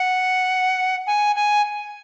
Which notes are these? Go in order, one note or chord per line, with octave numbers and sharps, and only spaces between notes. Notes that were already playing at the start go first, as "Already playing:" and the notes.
Already playing: F#5
G#5
G#5